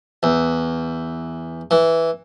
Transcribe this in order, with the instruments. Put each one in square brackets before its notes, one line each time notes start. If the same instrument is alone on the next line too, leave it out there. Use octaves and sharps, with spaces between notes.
[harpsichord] E2
E3